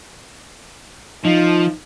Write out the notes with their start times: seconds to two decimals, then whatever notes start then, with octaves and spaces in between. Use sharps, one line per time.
1.24 F3 D#4